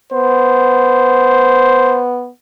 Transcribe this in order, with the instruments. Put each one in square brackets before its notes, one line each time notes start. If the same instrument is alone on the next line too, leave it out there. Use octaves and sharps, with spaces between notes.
[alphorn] B3 [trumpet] C5